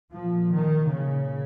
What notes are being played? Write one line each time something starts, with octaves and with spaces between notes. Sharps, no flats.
A#2 F3
D#3
C#3